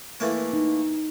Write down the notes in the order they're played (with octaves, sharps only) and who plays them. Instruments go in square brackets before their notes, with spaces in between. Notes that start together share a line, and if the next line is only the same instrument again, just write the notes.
[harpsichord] E3 A3 A#3
[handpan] D#4